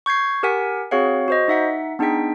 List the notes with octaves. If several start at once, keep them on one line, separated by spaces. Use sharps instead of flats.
C#6 G6 G#6 C7
G4 A#4 F#5 G#5 B6
C4 F#4 G#4 C#5 F5 F#5
F#4 C5 D#5
D#4 E5 F#5 B6
B3 D4 D#4 G#4 G5 B6